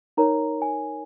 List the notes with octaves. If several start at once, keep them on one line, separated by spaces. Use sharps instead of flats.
D#4 A#4 C#5 A#5
G#5